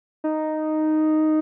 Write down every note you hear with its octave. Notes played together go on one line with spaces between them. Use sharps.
D#4